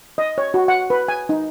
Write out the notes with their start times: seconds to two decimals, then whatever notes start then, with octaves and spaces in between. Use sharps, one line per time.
0.18 D#5
0.38 C#5
0.54 F#4
0.68 F#5
0.90 B4
1.08 G#5
1.29 D#4